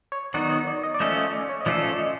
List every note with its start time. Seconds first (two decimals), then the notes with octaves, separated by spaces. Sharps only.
0.12 C#5
0.34 D#3 F#3 B3 D#4 F#4 D5
0.50 C#5
0.67 D5
0.83 D#5
0.94 D5
1.00 F3 A3 C#4 F4 A4 D#5
1.17 D#5
1.33 D5
1.49 C#5
1.61 D#5
1.66 F3 A3 C#4 F4 A4 D5
1.93 D5
1.99 D#5